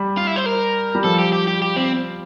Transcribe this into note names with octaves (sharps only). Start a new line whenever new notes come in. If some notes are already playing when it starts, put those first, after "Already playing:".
Already playing: G3
F4
E4
C5
A#4
G3
F3 A4
G4
G4
G4
G4
C4